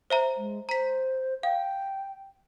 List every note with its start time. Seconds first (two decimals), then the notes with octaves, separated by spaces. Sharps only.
0.10 C5 E5 A#5
0.37 G#3
0.69 C5 A#5 B6
1.43 F5 G5